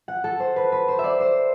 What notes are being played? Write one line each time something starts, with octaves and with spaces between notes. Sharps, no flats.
F#5
A4
C5
B4
B4
C5
E5
D5
C5